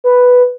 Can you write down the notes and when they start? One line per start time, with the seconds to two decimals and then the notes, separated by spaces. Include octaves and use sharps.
0.04 B4